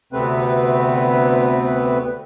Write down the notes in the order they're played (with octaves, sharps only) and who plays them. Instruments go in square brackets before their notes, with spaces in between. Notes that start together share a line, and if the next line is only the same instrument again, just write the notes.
[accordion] D2 C3 A3 B3 C4 B4